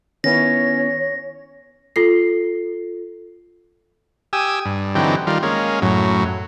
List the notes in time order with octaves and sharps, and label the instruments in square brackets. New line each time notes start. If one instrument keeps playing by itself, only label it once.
[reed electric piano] D#3 B3 E4 [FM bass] C#4 [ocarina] C#5 [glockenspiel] A#6
[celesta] F4 A4 C7
[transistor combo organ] G4 G#5 D#6 E6
G2
D3 E3 F#3 C4 D#4 G4
D#3 G3 F4
G#3 A#3 C#4
F#2 A2 F#3